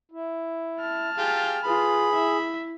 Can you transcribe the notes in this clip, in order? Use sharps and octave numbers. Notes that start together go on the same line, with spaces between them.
E4
A5 F6
F4 G4 G#4
F4 G#4 B4 B5
E4 E5